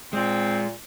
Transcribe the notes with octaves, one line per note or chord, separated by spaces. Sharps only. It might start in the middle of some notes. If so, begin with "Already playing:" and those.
A#2 G#3 C4